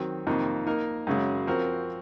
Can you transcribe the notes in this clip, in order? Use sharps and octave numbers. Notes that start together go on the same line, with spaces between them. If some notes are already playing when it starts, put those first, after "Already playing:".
Already playing: D#3 F#3 C4
F2 C3 D#3 A#3 D#4
A#3 D#4 A#4
F#2 C#3 G#3
F3 C4 F#4 A#4